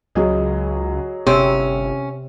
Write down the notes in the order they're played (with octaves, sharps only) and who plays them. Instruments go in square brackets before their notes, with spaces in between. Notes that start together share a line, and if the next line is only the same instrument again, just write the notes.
[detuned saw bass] C#2 [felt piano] F#3 G#4 D#5
[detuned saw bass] G1 [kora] C3 C4 [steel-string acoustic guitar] C#4